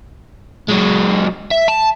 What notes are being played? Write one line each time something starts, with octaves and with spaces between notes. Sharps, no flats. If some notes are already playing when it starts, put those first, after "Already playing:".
F#3 G#3
E5
A5